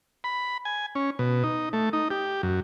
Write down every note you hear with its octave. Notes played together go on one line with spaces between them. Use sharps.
B5
G#5
C#4
B2
D#4
A3
D#4
G4
F#2